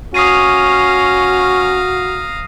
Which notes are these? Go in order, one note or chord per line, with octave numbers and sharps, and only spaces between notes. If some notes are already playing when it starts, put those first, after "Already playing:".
C#4 F#4 F5 A#5 D#6 C7 D#7